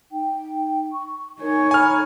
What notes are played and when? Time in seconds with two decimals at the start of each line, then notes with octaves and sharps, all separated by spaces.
0.12 D#4 G5
0.92 C#6
1.40 D#4 A#4 C#5 G#5
1.71 A4 G#5 A#5 B5 F6